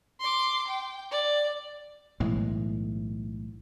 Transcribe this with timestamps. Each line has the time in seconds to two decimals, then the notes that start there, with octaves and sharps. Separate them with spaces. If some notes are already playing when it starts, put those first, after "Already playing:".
0.20 C6 D6
0.67 G5
1.11 D5
2.20 B1 A2 E3 G#3